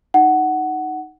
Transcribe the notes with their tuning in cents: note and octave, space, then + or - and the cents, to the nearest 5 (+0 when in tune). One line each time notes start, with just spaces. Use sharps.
D#4 +0 F#5 +10